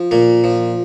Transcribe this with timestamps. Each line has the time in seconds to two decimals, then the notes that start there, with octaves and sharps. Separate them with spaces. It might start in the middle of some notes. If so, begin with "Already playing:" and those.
Already playing: F3
0.11 A#2 A#3
0.44 F3